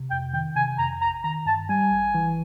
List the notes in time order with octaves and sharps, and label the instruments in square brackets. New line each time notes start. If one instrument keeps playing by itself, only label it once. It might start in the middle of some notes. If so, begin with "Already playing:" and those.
Already playing: [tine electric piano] C3
[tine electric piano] F2 [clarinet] G5
[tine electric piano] D#3 [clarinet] G5
[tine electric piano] C3 [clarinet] G#5
[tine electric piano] F2 [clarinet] A#5
[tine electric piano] A1 [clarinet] A#5
[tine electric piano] D#3 [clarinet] A#5
[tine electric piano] G2 [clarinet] A5
[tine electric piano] G3 [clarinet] G#5
[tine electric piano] A1
E3